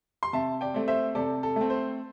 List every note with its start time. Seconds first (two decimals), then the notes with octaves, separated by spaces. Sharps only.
0.23 C6
0.33 C3 E5 A5
0.61 D5 G5
0.74 A3 C4
0.88 C5 E5
1.15 C3 A4 D5
1.43 A4
1.56 A3 C4
1.70 C5